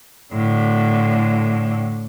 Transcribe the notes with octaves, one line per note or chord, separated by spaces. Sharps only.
A2 D3